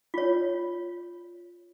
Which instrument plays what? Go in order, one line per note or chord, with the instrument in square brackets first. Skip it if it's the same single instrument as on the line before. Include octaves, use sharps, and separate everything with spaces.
[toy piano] F4 C#5